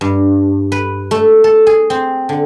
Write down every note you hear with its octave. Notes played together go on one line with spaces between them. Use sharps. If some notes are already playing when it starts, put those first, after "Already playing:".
G2
B4
A3
A4
G#4
C4
D3